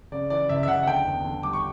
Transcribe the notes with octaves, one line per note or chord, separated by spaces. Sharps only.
C#3 D5
E3 D5
C#2 E5
E5
C#2 F#5
F#5
D3 G5
E2
D3
G3 D6
C#6